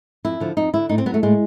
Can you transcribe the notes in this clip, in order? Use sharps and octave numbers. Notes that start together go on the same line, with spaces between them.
F2 E4
D3 F3
F2 D#4
D3 F3 E4
A2 D#4
C4
F#3 B3
A3
A2 G#3